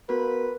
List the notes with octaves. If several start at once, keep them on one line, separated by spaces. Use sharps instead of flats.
B3 F#4 A#4 B4